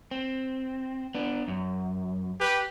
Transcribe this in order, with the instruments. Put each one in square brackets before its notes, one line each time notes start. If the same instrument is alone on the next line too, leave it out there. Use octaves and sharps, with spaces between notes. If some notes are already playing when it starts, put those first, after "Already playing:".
[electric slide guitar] C4
B3 D4
F#2
[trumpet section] G4 B4